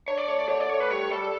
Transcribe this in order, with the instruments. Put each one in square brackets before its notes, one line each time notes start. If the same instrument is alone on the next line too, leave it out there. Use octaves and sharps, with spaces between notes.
[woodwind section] D4 [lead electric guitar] C#5
[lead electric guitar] D5
[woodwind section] A3 [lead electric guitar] C#5
[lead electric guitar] D5
[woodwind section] D3 [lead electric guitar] C#5
[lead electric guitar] D5
[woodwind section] A3 [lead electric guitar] C#5
[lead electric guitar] B4
[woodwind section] G3 [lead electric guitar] C#5
[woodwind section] G3 [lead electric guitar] A4